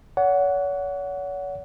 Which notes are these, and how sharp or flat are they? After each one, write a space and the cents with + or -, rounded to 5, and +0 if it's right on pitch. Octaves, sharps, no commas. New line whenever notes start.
C#5 +40 F#5 +0